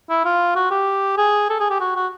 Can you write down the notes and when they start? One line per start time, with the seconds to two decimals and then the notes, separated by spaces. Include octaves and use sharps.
0.10 E4
0.25 F4
0.55 F#4
0.71 G4
1.17 G#4
1.50 A4
1.60 G#4
1.70 G4
1.80 F#4
1.96 F#4